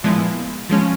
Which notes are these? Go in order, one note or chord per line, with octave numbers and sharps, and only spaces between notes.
A#2 F3 G#3 B3 E4
F3 G#3 C#4